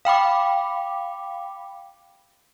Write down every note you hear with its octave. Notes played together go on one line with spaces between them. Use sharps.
F5 G5 B5 D6